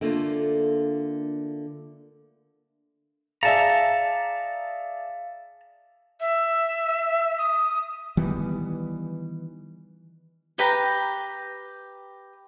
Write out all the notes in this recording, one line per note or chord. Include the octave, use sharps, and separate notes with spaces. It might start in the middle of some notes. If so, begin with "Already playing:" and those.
D3 A3 A#3 D4 F4
G#4 D5 E5 F5 A5 A#5 A6 C#7
E5
D#6
D#3 E3 G3 B3
G4 B4 G5 A#5